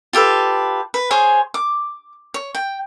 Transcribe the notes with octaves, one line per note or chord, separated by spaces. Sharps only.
F4 G4 A4 B4
B4
G#4 C5 C#5 G#5
D6
C#5
G5